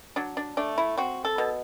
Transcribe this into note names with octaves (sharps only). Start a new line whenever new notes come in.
F#3 D4
D4
A3 D4
E4
C4 F#4
A4
B2